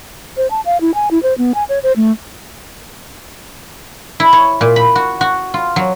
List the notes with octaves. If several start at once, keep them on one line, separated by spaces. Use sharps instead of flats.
C5
A5
F5
E4
G#5
E4
C5
B3
G#5
C#5
C5
A3
E4
C#5
A#2
B5
F#4
F#4
F4
F#3